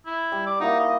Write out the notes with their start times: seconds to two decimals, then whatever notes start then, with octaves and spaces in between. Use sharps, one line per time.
0.06 E4
0.32 G3
0.46 D5
0.60 A#3 D#4 E4 F#4
0.80 D#5